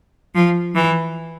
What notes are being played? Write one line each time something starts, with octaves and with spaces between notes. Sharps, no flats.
F3
E3